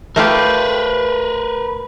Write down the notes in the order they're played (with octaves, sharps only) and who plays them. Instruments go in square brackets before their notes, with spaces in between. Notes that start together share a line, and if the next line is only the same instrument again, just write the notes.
[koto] A3 F4 G4 [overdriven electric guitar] A#4 B4